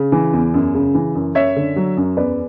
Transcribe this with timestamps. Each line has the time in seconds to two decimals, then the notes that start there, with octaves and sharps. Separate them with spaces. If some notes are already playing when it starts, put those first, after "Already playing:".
Already playing: C#3
0.12 E3
0.33 E2
0.54 F#2
0.74 C#3
0.95 E3
1.15 F#2
1.35 F#2 C#5 E5
1.56 D3
1.76 F#3
1.97 F#2
2.17 E2 B4 D5